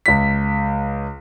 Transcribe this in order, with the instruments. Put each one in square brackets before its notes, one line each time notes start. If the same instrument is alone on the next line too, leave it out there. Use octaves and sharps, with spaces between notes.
[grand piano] C#2 B6